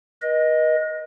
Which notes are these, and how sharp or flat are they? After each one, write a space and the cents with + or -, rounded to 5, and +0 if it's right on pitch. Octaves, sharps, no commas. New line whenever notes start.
B4 -45 D#5 +0